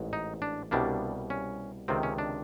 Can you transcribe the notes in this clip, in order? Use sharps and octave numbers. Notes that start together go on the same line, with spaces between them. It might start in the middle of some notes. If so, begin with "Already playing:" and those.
Already playing: A1 G#2
D#4
D4
C2 B2 G3 A#3 D4
C#4
C#2 C3 D#3 C4
C#4
D4